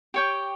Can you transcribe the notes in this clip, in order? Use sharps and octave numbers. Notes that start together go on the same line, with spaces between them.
G4 C#5 G5